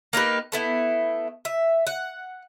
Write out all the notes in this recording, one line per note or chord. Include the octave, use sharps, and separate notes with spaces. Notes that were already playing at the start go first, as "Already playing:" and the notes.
A#3 D#4 G4 B4
A3 B3 E4
E5
F#5